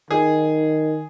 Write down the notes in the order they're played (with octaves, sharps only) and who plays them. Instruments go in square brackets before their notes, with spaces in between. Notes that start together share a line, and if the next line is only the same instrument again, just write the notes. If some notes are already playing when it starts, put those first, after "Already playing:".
[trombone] D#3 [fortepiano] G#4